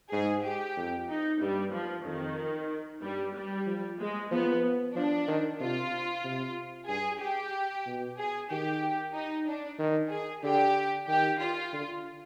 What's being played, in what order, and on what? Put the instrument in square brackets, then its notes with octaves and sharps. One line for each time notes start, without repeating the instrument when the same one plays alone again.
[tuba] G#2 [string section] G#4
[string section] G4
[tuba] F2
[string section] D#4
[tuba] G2 [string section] G3
[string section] F3
[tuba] F2 [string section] D#3
[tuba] G2 [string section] G3
[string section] G3
[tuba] F3
[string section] G#3
[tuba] F3 [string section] B3
[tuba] F3 [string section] D4
[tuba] D#3
[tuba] C3 [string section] F4
[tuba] C3
[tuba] G2 [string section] G#4
[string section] G4
[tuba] B2
[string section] G#4
[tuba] D#3 [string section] G4
[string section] D#4
D4
[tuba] D#3
[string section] G#4
[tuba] D3 [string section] G4
[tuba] D#3 [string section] G4
[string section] F4
[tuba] D3